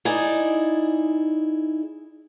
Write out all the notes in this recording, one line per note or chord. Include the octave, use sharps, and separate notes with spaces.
D#4 E4 G#4 D5